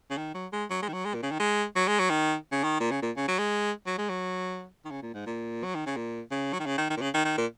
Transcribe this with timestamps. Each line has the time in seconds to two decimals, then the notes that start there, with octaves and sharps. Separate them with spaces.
0.10 C#3
0.18 D#3
0.34 F#3
0.52 G#3
0.70 F#3
0.82 G#3
0.88 D#3
0.93 F#3
1.05 G#3
1.14 A#2
1.22 C#3
1.31 D#3
1.40 G#3
1.76 F#3
1.87 G#3
1.99 F#3
2.10 D#3
2.52 C#3
2.63 D#3
2.80 A#2
2.91 C#3
3.02 A#2
3.16 C#3
3.28 F#3
3.38 G#3
3.86 F#3
3.98 G#3
4.09 F#3
4.85 D#3
4.91 C#3
5.02 A#2
5.14 G#2
5.26 A#2
5.64 F#3
5.75 D#3
5.86 C#3
5.96 A#2
6.31 C#3
6.53 F#3
6.59 D#3
6.66 C#3
6.78 D#3
6.90 D#3
6.97 A#2
7.01 C#3
7.14 D#3
7.25 D#3
7.37 A#2